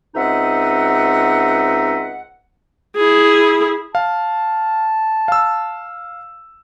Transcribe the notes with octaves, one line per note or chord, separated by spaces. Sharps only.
C#2 C4 D#4 D#5 E5 F#5
E4 G#4
F5 A5
F5 E6